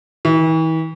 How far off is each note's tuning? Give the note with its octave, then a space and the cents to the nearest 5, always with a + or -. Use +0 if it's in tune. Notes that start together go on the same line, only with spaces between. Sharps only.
E3 -40